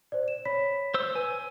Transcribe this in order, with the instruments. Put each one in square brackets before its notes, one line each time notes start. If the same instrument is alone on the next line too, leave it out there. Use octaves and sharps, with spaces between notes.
[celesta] C5 D5
E7
C#5 B5 B6
[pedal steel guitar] C5 E6
[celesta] B4 E6 [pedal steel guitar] G#5